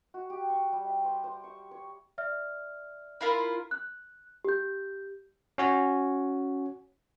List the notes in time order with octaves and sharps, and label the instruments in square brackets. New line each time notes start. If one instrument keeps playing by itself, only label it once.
[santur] F#4
G4
C#6
G3
E5
C5
C5
C#6
C#5
[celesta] D5 E5 F6
[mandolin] E4 F4 A#4
[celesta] F#6
G4 G6
[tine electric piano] C#4 F#4 G#5